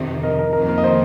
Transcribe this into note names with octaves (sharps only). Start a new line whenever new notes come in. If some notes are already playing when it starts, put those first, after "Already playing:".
Already playing: F2 C3 D#3
A#4 D#5
A#4
F2 D#3 A#3 A#4
A#4
D#5
C5